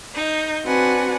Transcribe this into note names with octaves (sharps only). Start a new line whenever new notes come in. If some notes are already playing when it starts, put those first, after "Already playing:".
D#4 G6
C4 D4 F#4 B4 F#5 G#5